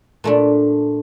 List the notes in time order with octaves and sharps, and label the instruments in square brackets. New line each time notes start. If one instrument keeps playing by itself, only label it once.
[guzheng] A#2 A3 D4